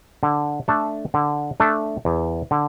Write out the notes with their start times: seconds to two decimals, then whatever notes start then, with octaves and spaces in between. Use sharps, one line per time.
0.23 D3
0.68 A3 D4 A4
1.14 D3
1.60 A3 D4 A4
2.05 E2
2.51 D3